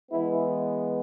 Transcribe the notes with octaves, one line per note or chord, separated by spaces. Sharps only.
E3 G#3 B3 E4